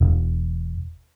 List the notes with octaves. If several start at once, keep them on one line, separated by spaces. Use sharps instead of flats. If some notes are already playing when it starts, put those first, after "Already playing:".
E1